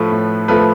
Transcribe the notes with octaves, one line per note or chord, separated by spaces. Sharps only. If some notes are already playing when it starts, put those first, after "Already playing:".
Already playing: A2 F3 A3 B4
A2
F3 A3 B4